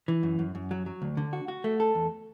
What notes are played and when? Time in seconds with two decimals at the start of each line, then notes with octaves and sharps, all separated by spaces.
0.08 E3
0.23 F#2
0.39 F#2
0.55 F#2
0.71 F#3
0.86 F#3
1.02 D2
1.17 D3
1.33 F#4
1.48 F#4
1.64 A3
1.80 A4
1.95 E2